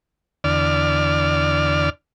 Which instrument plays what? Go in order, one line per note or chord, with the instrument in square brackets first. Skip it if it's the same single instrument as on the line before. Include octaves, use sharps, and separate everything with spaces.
[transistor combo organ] E2 D3 D5 F6